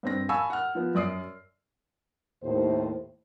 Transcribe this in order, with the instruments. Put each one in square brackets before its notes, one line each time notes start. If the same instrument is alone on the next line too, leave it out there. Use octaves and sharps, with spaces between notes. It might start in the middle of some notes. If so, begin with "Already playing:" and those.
[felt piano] G2 C4 A#6
F5 G#5 A5 B5 C#6 E6
F#5 F6
F3 B3
F#2 D5 D#6 C7
[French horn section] D#2 A2 C5